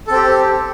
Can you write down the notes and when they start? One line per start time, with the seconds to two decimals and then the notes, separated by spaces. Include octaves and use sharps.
0.07 A4
0.11 C4
0.15 G4